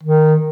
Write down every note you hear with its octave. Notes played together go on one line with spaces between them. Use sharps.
D#3